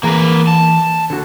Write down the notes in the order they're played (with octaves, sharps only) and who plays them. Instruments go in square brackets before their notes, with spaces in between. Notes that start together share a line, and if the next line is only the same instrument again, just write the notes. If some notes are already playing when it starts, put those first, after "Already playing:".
[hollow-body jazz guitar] E3 G#4 A#5 [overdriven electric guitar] A#3 B4
[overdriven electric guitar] A5
[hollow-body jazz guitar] D3 F#4